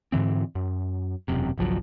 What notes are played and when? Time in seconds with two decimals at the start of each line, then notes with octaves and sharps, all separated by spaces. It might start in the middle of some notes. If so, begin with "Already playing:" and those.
0.12 G#2 D3 E3 C4
0.55 F#2
1.28 E1 F#2 C3
1.58 G#1 C#2 F3 F#3